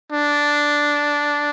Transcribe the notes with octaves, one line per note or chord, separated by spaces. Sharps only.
D4